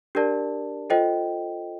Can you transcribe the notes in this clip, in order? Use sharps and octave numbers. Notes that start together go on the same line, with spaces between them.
D4 G4 A#4 D5 A5
F4 A4 C5 D#5 G5